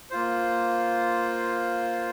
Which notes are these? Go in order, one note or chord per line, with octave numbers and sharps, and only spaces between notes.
A#3 F4 C5